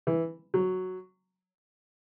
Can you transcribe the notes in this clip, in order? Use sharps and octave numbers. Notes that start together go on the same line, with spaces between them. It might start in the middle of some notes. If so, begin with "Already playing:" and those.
E3
F#3